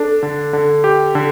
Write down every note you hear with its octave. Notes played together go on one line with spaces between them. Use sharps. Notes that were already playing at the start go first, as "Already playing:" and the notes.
Already playing: D4 A4
D3
D3
G4
D3